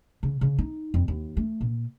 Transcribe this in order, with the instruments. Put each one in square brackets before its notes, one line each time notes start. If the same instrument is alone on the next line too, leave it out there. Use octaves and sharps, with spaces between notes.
[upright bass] C#3
C#3
D#4
F2
D#2
A3
A#2